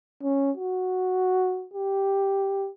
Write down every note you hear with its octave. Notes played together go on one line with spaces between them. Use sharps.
C#4
F#4
G4